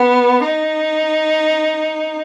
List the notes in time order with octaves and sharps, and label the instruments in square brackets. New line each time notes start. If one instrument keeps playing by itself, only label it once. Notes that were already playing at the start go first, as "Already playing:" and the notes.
Already playing: [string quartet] B3
D#4